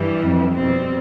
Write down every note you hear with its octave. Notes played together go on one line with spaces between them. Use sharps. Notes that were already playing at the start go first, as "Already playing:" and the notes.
Already playing: G2 E3 G3
F2
B2 G3 C4